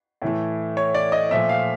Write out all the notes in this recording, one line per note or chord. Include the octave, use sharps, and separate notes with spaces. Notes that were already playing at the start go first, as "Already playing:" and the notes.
A2 E3 A3
C#5
D5
D#5
A#2 F3 A3 E5
F5